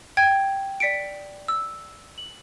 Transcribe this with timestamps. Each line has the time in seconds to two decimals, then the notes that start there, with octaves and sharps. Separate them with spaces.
0.17 G5 G#6
0.80 D5 B6 C#7 D7
1.48 E6
2.18 F#7